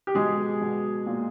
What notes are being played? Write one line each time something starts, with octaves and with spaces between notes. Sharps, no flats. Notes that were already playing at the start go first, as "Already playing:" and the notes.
G4
B2 G#3 G#4
B2
A#2